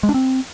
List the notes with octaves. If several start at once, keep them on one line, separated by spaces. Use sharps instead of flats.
G#3
D4
C4